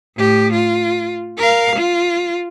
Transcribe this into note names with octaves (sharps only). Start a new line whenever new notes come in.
A2 G4
F4
A#4 F5
F4